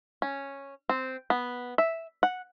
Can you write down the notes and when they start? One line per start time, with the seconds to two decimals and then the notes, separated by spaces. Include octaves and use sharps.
0.22 C#4
0.89 C4
1.30 B3
1.78 E5
2.23 F#5